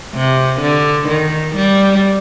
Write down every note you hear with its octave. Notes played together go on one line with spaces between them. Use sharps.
C3
D3
D#3
G3